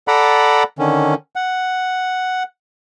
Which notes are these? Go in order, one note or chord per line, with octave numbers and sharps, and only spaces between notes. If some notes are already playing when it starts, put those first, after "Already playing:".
A4 D5 F#5 A#5 B5
D3 D#3 C#4
F#5